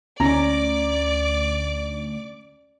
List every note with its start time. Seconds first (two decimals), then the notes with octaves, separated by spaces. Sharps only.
0.20 D2 C#4 D5 A#5 D6